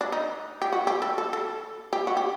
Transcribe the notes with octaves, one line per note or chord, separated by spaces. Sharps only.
D4
D#4
G4
F#4
G4
A4
A4
A4
G4
F#4
G4